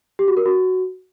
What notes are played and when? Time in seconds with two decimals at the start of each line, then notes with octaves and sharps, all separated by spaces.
0.19 G4
0.28 F#4
0.37 A#4
0.46 F#4